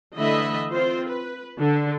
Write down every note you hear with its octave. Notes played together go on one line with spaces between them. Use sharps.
D3 E3 A3 D#5 E5 B5
C4 F4 C5
B4
D3